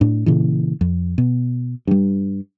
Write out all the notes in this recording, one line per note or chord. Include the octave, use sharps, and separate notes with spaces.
A2 D4
A#2 C#3 E3
F2
B2
G2 G3